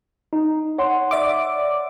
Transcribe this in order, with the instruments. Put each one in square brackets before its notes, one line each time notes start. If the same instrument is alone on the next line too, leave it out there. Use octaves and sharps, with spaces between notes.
[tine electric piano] D#4
C#5 F#5 C6
[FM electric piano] D5 E5 D6